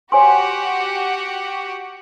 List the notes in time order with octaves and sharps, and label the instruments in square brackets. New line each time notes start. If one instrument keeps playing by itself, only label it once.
[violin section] F#4 G4 F#5 [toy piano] C#5 G#5 C6